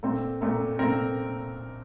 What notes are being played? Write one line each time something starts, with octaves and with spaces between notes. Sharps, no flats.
A#2 A3 C4
A#2 A3 C4
A#2 A3 C4 A#4